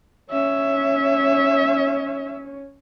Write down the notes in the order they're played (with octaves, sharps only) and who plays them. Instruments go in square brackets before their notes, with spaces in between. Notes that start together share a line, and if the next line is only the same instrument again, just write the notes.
[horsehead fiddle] C#4 C#5 [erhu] E5